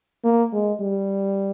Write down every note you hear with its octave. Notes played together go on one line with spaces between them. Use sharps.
A#3
G#3
G3